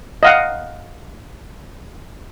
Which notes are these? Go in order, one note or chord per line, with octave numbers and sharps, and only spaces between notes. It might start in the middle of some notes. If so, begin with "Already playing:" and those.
D#5 F5 F#5